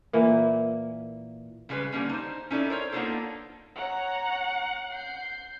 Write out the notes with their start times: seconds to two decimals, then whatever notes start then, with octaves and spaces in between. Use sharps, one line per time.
0.13 A#2 E3 A#3
1.69 C#3 G3 G#3 G#4 B4
1.92 D3 G3 A#3 C#4
2.09 D#4 C5
2.51 C#4 D#4 E4 A4 D5
2.70 A#4 C5 C#5
2.92 A#3 B3 D4 D#4 F4 A4
3.76 C#5 F#5 A#5
4.91 G6 C7